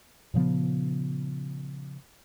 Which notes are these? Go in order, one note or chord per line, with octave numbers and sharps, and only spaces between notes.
A#2 C#3 F3 B3